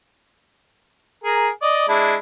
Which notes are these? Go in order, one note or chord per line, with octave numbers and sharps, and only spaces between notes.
G#4 A#4
D5 D#5
G#3 D4 E4